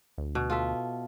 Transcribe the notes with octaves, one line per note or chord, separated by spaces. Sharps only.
D2
B2
F4 A4 E5